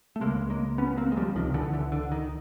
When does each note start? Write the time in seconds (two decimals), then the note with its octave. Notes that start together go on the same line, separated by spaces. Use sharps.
0.16 A3
0.21 C#2 C#3 G#3 A#3
0.50 G#3 A#3
0.78 B3 C#4
0.97 A#3 C4
1.12 G#3
1.17 F3 G3
1.35 C#2 C3 D#3 F3
1.54 D3 E3
1.74 D3 E3
1.92 D3
2.12 D#3